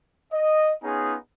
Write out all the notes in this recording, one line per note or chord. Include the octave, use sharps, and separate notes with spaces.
D#5
B3 C#4 D#4 F4 G#4